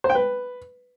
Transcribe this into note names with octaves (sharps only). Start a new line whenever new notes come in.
C5
G5
B4